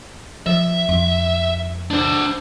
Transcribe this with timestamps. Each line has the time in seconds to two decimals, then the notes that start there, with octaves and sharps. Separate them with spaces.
0.46 F3 E5
0.88 F2
1.90 D4 C5